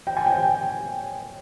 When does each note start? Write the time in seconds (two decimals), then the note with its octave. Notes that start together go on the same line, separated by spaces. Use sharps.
0.07 G5
0.17 G#5
0.26 G5